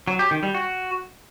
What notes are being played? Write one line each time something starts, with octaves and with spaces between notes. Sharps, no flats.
F#3
G4
D#3
G3
F#4